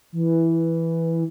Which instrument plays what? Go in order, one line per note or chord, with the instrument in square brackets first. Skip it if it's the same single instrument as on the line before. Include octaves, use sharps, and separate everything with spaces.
[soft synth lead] E3